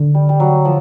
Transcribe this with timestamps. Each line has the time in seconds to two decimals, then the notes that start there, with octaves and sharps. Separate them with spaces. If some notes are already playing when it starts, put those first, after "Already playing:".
Already playing: D3
0.15 G3
0.29 G3
0.40 F#3
0.65 F3